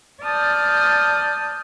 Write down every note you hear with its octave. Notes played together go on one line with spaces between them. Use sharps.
D5 A5 D#6 F6 G6